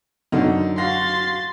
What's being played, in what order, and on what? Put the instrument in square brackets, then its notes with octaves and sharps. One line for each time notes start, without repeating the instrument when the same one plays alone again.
[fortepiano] F#2 D3 [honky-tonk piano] D#4
[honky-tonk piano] F#4 F5 A#6 [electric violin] C6 A6